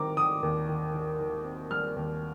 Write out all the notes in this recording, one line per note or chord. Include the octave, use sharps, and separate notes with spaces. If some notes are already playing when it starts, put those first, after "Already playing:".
Already playing: D#3 G3 C4 A#5 D6
D#3 D#6
D#2
D#3
D#3
D#3
C4
G3 F6
D#2